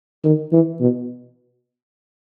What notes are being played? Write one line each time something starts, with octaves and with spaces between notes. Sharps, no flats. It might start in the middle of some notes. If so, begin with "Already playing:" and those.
D#3
E3
B2